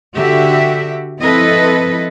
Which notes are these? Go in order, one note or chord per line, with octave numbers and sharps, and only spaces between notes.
D3 F#4 G4 E5
F3 C4 E4 A4 B4 D#5